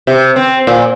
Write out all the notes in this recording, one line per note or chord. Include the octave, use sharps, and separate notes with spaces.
C3
C4
A#2